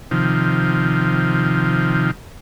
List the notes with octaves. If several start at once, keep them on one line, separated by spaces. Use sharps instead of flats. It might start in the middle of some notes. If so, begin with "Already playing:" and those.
C3 D#3 F3